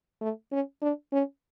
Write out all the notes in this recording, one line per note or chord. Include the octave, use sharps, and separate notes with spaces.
A3
C#4
D4
C#4